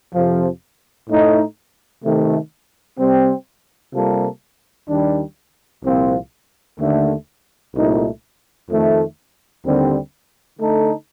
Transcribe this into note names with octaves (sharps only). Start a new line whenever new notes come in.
F2 C3 F3
A2 A3 D#4
C3 D#3 A3
C3 G3 C4
C3 G3 A#3 F4 A4
D#2 D#3 G3 D4
C2 A#2 F3 C4 F4
D#2 D3 A3
C2 A#2 A3 D#4
F2 D#3 A3
D#2 D3 G3 C4
D3 A3 D#4 A4